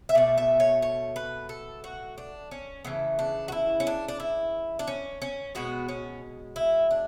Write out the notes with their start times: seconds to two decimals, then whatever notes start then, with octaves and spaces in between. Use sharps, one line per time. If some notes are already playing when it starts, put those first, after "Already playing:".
0.09 E5
0.15 B2 A3 D5
0.38 E5
0.60 C#5
0.82 C#5
1.16 B4
1.49 A4
1.84 F#4
2.18 D4
2.51 C#4
2.84 C#3 E3 A3 B3
3.19 D4
3.48 F#4
3.52 E4
3.80 C#4
3.87 D4
4.08 D4
4.20 E4
4.79 D4
4.87 C#4
5.22 C#4
5.55 B2 G#3 B3 F#4
5.88 C#4
6.56 E4
6.91 D4